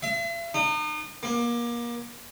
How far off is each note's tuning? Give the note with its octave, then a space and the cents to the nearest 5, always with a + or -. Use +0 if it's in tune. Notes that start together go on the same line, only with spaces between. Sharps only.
E5 +45
D#4 -35
A#3 +30